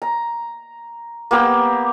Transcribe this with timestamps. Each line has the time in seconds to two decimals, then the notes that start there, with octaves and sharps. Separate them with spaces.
0.02 A#5
1.31 A#3 B3 G4 E6